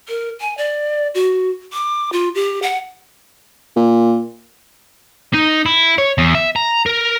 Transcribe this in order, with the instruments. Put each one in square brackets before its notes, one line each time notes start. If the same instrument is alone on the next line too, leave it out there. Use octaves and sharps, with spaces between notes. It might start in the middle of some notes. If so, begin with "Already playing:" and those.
[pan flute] A#4
G#5
D5
F#4
D6
F4
G4
F#5
[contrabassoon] A#2
[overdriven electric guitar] D#4
E4
C#5
E2
E5
A#5
A#4